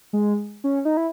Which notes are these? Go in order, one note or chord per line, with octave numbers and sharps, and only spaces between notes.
G#3
C#4
D#4
E4